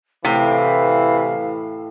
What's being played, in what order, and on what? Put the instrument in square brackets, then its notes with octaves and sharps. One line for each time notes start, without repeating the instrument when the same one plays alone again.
[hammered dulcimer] A2 G5 [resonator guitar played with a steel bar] C3 [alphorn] E3 [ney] F5